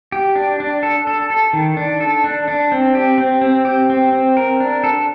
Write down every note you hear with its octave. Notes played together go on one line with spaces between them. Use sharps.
G4
D4
D4
A4
A4
A4
D#3
D4
A4
D4
D4
C4
G4
C4
C4
G4
C4
C4
A#4
D4
A4